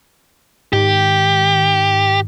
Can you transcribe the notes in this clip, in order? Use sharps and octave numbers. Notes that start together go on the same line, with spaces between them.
G#2 D#3 G4